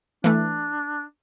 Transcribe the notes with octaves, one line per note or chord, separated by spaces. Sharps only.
E3 A3 D4